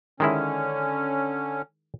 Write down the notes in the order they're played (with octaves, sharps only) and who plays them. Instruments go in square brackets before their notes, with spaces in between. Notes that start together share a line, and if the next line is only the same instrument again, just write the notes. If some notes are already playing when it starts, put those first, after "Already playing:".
[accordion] D3 C#4 [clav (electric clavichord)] D#3 G#3 E4